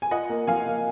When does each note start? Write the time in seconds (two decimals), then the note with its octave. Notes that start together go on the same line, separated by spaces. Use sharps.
0.02 G#5
0.11 F4 D#5 F#5
0.30 A#3
0.47 F3 F5 G#5
0.65 A#3